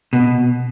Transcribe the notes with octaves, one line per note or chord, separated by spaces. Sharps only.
B2